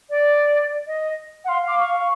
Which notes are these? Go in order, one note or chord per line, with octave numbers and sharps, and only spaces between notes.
D5
D#5
F#5
F5 C6
F5 D6
F5 C#6
F5